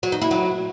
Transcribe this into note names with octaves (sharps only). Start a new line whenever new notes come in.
F#3
D#4
E4
F#3